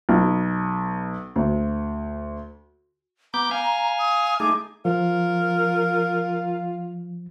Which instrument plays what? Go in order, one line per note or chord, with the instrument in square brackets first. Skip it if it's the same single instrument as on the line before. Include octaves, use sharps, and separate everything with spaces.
[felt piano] B1
D2
[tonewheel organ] B3 D6 G6 [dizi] A#5
[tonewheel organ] F5 G#5
[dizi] D#6
[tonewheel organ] A3 D#4 G#4 [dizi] D6
[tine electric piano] F3 [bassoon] F4 [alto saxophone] A#4